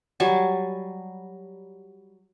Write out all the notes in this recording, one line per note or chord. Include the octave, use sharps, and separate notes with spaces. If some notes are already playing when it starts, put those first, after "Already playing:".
F#3 G3 G#5 A5